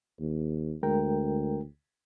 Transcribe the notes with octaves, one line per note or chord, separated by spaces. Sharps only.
D#2
D2 G#3 A#4 G5